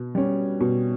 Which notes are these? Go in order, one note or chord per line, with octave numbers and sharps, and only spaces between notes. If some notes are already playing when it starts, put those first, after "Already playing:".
Already playing: B2
G3 C#4
B2